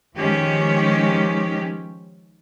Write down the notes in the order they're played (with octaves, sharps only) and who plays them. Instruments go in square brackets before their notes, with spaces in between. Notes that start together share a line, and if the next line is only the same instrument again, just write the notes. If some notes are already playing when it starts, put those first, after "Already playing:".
[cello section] D#3 F3 G#3 C#4 G4